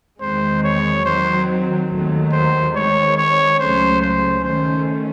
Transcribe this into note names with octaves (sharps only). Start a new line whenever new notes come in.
E2 D#3 G#3 C4 C5
C#5
D#3 F#3 C4 C5
D#2 D#3 F#3 A3
C5
D#3 G#3 C4 C#5
C#5
C#2 C#3 F#3 A3 C#4 C5
C5
D#3 A3 C#4 C5